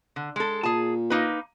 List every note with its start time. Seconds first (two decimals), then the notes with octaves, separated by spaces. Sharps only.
0.16 D3
0.36 G#3 A4
0.63 A#2 G#4 A5
1.10 A#3 D#4 B4